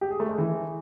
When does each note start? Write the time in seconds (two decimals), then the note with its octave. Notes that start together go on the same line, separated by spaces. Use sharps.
0.01 G4
0.11 G#4
0.20 A3
0.29 G#3
0.38 E3